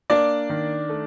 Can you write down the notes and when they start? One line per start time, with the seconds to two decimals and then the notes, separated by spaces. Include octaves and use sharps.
0.10 A#3 D4 D5
0.50 D#3
0.89 A3